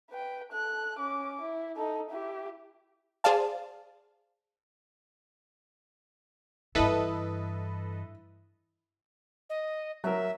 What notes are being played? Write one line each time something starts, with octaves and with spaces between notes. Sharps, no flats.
B4 G5
A4 F#6
C#4 D6
E4
D#4 A4
E4 G4
G#4 C5 D5 F5 A5
G2 E3 E4 A4 B4 D#5
D#5
F#3 A#4 E5